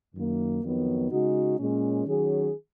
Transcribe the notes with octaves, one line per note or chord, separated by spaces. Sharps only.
F#2 D#3 A#3
F2 D#3 F#3 B3
C#3 G#3 D#4 F#4
A#2 G#3 C#4
D#3 F#3 C#4 G#4